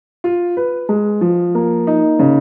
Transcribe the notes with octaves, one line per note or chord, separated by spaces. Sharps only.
F4
B4
G#3
F3
A#3
D#4
C#3